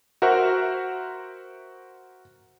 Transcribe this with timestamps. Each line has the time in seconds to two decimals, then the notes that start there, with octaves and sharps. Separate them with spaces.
0.22 F#4 A#4 C5 E5 F#5 C#6